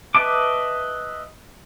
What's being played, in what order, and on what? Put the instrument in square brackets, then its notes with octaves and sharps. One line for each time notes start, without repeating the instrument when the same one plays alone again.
[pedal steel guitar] B4 D#5 E5 A5 D6